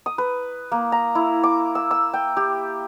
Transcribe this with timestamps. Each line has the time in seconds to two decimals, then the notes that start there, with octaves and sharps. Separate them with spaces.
0.06 D#6
0.18 B4
0.72 A#3
0.92 A#5
1.15 E4
1.43 D6
1.75 E6
1.91 E6
2.14 G5
2.37 G4